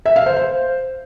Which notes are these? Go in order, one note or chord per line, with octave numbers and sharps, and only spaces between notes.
E5
F5
C5
C5